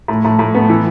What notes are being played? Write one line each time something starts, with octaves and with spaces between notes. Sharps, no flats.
A2
A2
A2
B3
E3